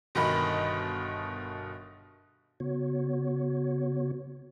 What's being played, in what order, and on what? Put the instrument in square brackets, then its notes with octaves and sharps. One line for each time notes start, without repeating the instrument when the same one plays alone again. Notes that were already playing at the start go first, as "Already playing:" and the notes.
[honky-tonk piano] G1 B2 D#3 D#5 B5
[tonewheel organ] C#3 B3 F#4 C#5